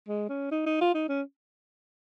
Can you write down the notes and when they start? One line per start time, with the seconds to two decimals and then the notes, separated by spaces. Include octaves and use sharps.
0.08 G#3
0.29 C#4
0.51 D#4
0.66 D#4
0.81 F4
0.95 D#4
1.09 C#4